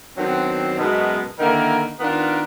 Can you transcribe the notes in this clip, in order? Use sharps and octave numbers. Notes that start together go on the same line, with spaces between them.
D#3 F#3 B3 C4 D4
F#2 B2 G#3 B3 A5
D3 D#3 A#3 E4 A#4
D#3 B3 D4 F4 A#4